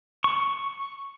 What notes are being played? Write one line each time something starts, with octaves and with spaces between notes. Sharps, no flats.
C#6